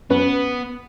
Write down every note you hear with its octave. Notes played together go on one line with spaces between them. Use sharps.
F#2 B3 C#4 B4